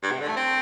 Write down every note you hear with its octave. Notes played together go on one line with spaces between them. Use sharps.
G2
C3
D3
A3
C4